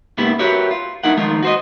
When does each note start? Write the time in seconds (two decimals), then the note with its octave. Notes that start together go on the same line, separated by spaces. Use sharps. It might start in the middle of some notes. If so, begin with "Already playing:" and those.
0.18 G#2 C#3 A#3 B3 E4 G4
0.39 F#4 G4 A#4 B4 C#5 E5
0.71 F4
1.03 G2 D#4 E4 A#4 F#5
1.17 D#3 F3 G#3 A3 F4 A#4
1.43 F#4 C5 D#5